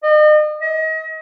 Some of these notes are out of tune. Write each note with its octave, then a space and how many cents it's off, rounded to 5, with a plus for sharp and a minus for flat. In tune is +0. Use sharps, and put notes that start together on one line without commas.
D#5 -40
D#5 +35